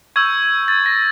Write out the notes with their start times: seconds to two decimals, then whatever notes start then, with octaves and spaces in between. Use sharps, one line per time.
0.16 C#6 E6 G6 G#6
0.68 A6
0.86 A#6